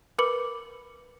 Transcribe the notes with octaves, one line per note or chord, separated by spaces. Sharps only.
A#4 B4 B5 D6 C#7 F#7